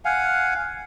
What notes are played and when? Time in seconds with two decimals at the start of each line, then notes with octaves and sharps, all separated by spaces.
0.05 F5 F#5 G#5